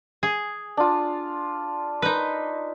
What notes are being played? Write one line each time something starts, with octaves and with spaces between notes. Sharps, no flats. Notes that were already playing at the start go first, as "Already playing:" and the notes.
G#4
D4 F4
D#4 B4